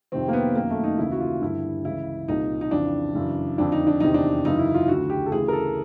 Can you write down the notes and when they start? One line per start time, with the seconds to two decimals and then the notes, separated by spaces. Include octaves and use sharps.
0.12 F2 C3 D#3 C4
0.28 A#3
0.33 B3
0.56 F#2 D#3 A#3
0.70 A3
0.83 D#4
0.98 D#2 C#3 E3 E4
1.12 F#4
1.21 F4
1.42 G2 D3 E4
1.85 C#2 C#3 E3 E4
2.28 C2 A#2 D#4
2.61 D#4
2.71 F2 C#3 E3 D4
3.15 F#2 C#3 E3
3.58 F2 D3 D4
3.72 D#4
3.87 D4
4.00 E2 C3 D#3 D#4
4.14 D4
4.45 F#2 C#3 E3 D#4
4.59 E4
4.74 F4
4.88 D2 D3 F#4
5.10 G4
5.26 A4
5.31 D2 C#3 E3 G#4
5.48 A#4
5.53 A4